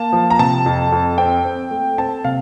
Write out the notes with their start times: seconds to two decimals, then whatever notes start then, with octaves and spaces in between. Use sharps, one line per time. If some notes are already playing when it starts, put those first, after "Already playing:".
Already playing: A#3 A5
0.13 F3
0.30 A#5
0.39 C3 A5
0.66 F2
0.92 F2
1.18 C4 G5
1.45 C4
1.71 A3
1.98 C4 A5
2.25 C3 F5